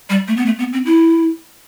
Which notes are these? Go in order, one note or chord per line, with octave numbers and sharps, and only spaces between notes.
G3
A3
B3
A3
B3
C4
E4